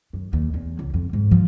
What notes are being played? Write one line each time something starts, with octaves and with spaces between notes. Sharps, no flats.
F#2
D#2
E2
C#2
F2
G#2
F3